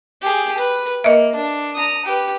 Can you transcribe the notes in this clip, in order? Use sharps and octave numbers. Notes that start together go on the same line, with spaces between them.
G4 G#4
B4
A#3 D#5 E5
D4
A#5 D#6
G4 B4